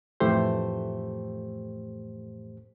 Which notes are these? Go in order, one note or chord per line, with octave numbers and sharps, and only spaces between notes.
F2 A2 E3 A3 G4 C5